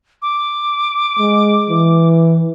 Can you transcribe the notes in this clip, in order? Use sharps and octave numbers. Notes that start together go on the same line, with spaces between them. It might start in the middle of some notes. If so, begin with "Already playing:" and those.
D6
G#3
E3